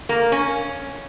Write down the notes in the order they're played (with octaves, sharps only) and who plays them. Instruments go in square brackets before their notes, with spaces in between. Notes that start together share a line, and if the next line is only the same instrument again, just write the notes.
[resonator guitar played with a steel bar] A#3
C#4